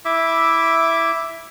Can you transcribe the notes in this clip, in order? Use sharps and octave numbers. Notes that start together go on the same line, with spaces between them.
E4 E5 D6